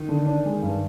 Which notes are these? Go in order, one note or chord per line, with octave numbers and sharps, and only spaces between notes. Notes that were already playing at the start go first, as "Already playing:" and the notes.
Already playing: D#3
D3
D4
G#3
G2